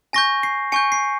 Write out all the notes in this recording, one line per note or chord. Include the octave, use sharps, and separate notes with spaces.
G#5 C#6 G6 A#6
C7
G#5 C#6 G6 C#7
C7